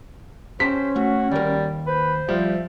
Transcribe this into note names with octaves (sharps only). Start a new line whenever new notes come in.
C#4 G4 C5 F#5 A5 B6
A3 F#4
D#2 G3 A#4
B4 C5
F3 G3 E5